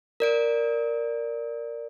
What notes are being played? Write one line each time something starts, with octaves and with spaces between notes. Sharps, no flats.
A#4 D5 D7